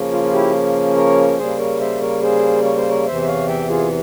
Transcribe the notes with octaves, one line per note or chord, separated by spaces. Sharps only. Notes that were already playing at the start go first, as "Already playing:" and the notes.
Already playing: C#3 F3 A#3 C#4
F4
F4
E4 G4
A#4 C#5
C#3 G3 A#3 G#4 C5
A#4 C#5
C5 E5
A#4 C#5
G#4 C5
C#5
C5
A#4 C#5
E2 C3 E3 C5 E5
E5
C#5 F5
E5 G5
F4 G#4